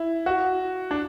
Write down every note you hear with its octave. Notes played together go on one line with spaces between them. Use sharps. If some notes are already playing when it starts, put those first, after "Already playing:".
Already playing: E4
F#4
D4